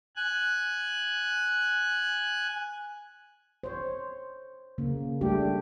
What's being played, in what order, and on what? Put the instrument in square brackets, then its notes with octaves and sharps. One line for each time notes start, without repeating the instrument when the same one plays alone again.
[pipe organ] G#5 F#6
[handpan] C5 C#5
C#3 A#3
G3 A3 D4 G4